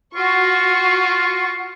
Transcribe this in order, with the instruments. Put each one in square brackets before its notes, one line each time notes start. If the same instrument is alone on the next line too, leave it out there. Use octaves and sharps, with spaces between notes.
[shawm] F4 [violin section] F#4 C#6